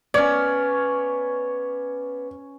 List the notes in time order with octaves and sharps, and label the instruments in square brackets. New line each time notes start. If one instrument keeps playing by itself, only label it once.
[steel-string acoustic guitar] B3 [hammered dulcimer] C#4 C#5 [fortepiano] D5